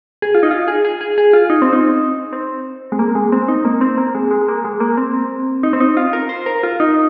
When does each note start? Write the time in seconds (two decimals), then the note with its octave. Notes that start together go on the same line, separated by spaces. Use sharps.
0.22 G#4
0.35 F4
0.43 D#4
0.51 F4
0.68 G#4
0.85 G#4
1.01 G#4
1.18 G#4
1.33 F4
1.50 D#4
1.62 C4
1.73 D#4
2.33 C4
2.92 G#3
2.99 A#3
3.15 G#3
3.32 C4
3.48 D#4
3.65 A#3
3.81 C4
3.98 A#3
4.15 G#3
4.31 G#3
4.42 G#3
4.48 A#3
4.65 G#3
4.80 A#3
4.97 C4
5.63 D#4
5.73 C4
5.80 D#4
5.97 F4
6.13 A#4
6.29 C5
6.46 A#4
6.63 F4
6.80 D#4